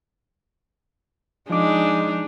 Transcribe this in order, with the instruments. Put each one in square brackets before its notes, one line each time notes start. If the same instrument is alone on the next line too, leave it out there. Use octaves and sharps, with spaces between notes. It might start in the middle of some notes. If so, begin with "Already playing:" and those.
[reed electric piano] F3 D6 [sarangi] G#3 [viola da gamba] D4 D#4